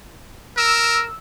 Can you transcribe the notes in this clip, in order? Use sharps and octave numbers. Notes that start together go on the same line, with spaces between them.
A#4 E6